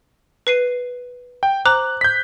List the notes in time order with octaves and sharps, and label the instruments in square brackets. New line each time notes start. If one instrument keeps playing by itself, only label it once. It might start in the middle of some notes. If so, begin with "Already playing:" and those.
[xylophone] B4 C7 D#7
[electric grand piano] G5
[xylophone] C5 A#5 D6 [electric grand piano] F#6
[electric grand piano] G6 B6